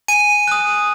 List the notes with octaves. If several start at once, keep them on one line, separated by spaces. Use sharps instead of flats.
G#5 D#7
D#6 F#6